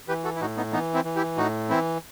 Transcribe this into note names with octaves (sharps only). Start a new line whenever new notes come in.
E3 G4 B4
F#4 A4
E4
A2 D#4 F#4
B3 D#4
E3 B3 D#4
C4 E4
E3
E4 G4
A2 D#4 F#4
E3 C4 E4